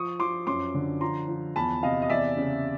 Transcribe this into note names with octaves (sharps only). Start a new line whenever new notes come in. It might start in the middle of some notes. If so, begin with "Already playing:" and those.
Already playing: F3 C#6 D#6
F3 C6 D6
F#2 C6 D6
D3
F3 A#5 C6
F3
E2 A5 B5
C3 D#5 F5
D#5
E2 D5 E5
C#3